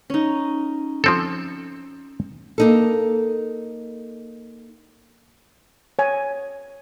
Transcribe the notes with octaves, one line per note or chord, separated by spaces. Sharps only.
C#4 D#4
F3 C4 A4
A#3 D#4 A4
C#5 G#5